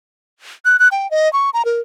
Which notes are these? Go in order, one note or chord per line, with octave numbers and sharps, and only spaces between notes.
F#6
F#6
G5
D#5
C#6
A#5
A#4